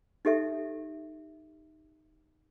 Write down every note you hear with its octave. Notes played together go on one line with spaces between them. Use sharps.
D#4 G4 A4 E5